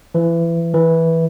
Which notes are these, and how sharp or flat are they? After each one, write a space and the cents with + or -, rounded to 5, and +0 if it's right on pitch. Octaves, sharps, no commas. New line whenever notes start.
E3 +25
E3 -10